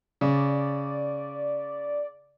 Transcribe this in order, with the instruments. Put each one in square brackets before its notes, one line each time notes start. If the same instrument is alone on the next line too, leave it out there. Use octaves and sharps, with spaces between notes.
[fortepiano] C#3 [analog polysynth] D5